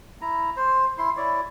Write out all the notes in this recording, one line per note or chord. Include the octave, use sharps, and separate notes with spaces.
E4 A#5
C5
E4 C6
E4 C#5 D5